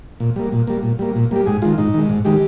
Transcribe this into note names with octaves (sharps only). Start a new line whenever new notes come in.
A#2
G3 A#3
A#2
G3 A#3
A#2
G3 A#3
A#2
G3 A#3 G4
G#2 G#4
D#3 G#3 F4
G#2 D#4
D#3 G#3
G#2
D#3 G#3 G4